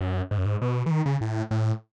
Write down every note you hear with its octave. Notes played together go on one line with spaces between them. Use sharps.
F#2
G#2
F#2
G#2
B2
E3
D#3
C#3
A2
A2